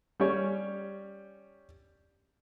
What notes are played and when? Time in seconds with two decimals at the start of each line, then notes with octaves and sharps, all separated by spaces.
0.20 G3 C#4 G4 C#5